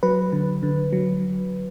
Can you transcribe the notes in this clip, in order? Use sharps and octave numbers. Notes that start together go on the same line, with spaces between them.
F#3 B4
D3
D3
F#3